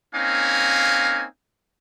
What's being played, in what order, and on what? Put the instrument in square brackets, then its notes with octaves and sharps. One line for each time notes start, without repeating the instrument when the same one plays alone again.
[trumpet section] A#3 C4 C#4 D#4 F5 G#5